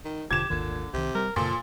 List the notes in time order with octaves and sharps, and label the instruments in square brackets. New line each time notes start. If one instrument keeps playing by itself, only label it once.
[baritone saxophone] D#3
[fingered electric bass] E1 B2 D3 [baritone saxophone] F3 [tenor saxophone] G4 [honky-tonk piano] G#6 E7
[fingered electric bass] G#1 D#2 D#3 [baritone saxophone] A#2 [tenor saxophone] D3
[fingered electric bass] C2 D#3 [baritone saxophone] C3
[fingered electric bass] G3 [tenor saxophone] A#4
[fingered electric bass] F#2 C#3 [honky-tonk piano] A#2 [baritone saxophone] F3 [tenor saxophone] A4